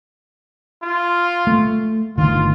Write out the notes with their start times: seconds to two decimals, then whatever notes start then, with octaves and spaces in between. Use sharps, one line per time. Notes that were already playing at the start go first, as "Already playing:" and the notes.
0.83 F4
1.47 A3
2.17 G1 D2 D#3 F4